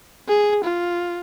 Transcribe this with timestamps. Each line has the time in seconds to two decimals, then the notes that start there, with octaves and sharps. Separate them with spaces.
0.28 G#4
0.64 F4